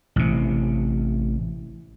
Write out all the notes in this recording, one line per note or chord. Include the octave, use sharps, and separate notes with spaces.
A1 C3